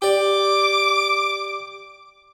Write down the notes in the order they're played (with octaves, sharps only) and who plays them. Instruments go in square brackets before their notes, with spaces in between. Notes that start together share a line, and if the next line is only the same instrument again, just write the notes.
[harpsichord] G4 D5 [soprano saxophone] D6